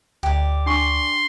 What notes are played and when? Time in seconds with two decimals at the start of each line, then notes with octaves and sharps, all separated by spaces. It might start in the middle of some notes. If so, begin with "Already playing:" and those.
0.23 D2 G4 D5
0.66 D4 G#5 C6 C#6